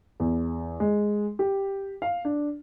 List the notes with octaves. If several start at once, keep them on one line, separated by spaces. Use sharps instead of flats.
E2
G#3
G4
F5
D4